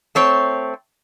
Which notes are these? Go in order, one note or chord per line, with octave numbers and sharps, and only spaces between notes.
A3 C4 C#5